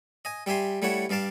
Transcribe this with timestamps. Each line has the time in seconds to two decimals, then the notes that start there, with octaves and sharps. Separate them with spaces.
0.25 D#5 G#5
0.46 G3 G4 E5 G#5 C6
0.82 G3 A3 E4 C#5 F#5
1.10 G2 G3 F5 A5 D6